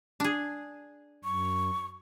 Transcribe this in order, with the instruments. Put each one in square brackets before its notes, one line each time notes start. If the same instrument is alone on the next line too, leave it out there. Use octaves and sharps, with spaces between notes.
[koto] D4 G#4
[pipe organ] F#2 [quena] C#6